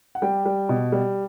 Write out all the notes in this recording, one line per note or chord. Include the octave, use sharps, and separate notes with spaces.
F#5
G3 G4 G5
G3
B2
G3